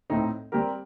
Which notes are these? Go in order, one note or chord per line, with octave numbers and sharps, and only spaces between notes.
A2 A3 C4 D#4
G3 C4 G4 A#4